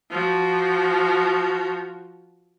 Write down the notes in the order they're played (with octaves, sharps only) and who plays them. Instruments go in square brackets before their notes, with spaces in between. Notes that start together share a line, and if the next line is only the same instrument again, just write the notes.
[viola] F3 F#4